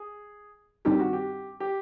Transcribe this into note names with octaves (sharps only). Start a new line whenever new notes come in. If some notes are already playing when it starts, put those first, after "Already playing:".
Already playing: G#4
G2 D#3 G3 C4 D#4 G4
F#4
G4
G4